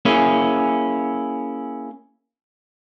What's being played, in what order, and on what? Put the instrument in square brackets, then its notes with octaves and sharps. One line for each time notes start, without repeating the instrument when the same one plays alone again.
[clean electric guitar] A#3 C#4 E4 G#4